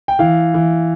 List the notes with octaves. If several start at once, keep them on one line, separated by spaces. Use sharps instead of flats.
G5
E3 F5
E3